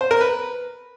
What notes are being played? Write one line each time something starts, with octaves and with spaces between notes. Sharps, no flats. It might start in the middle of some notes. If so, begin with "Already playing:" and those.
C5
A#4
B4